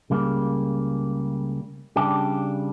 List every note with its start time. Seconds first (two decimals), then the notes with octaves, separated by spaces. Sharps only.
0.10 C#2 C#3 G3 A#3
1.96 C#3 G3 D4 G4